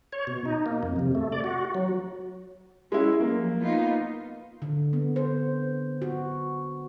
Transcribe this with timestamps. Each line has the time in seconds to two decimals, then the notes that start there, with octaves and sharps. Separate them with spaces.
0.13 C#5
0.27 B2
0.45 D#4
0.66 A#3
0.83 F2
0.99 C3
1.15 A3
1.32 D5
1.44 F#4
1.75 F#3
2.92 G#3 C#4 E4
3.20 F3 F#3 A#3
3.59 B3 D#4 F4
4.62 D3
4.93 B3
5.16 C5
6.02 F#4